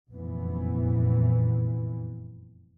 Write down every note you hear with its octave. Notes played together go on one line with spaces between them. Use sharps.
F1 F#2 A#2 E3 B3